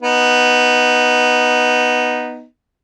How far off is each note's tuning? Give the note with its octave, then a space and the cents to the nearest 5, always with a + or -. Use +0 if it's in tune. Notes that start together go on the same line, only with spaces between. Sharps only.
B3 +0 D#4 +0